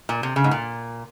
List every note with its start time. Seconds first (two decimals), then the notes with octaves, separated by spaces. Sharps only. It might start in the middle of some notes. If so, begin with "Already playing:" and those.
0.09 A#2
0.23 C3
0.36 C#3
0.44 G#2
0.51 A#2